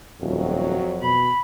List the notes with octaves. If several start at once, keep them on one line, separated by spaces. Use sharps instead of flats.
D#1 F2 F#3
B2 B5